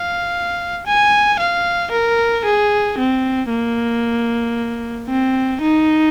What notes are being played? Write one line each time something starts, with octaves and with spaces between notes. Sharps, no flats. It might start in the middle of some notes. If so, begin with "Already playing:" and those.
Already playing: F5
G#5
F5
A#4
G#4
C4
A#3
C4
D#4